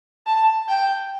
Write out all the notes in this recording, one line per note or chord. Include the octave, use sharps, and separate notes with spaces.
A5
G5